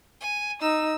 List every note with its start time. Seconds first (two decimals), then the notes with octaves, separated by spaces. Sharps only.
0.21 G#5
0.62 D#4 E6